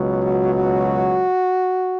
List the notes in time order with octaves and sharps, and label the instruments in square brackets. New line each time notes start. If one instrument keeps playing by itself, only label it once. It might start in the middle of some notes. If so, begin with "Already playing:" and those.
Already playing: [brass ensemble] C#2 B2 F#3
F#4
F#4